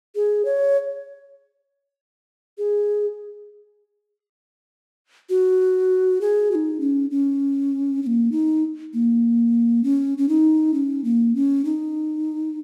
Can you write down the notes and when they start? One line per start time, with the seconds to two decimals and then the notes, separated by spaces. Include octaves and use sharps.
0.16 G#4
0.45 C#5
2.58 G#4
5.29 F#4
6.21 G#4
6.51 F#4
6.55 D#4
6.80 C#4
7.11 C#4
8.03 C#4
8.07 A#3
8.32 D#4
8.93 A#3
9.84 C#4
10.18 C#4
10.29 D#4
10.74 C#4
11.04 A#3
11.36 C#4
11.65 D#4